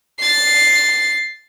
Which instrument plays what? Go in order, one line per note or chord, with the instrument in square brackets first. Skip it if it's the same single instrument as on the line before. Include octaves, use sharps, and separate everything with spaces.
[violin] A6 C7